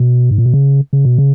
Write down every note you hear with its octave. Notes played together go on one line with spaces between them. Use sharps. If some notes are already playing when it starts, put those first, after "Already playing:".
Already playing: B2
G#2
A#2
B2
C#3
C#3
B2
C#3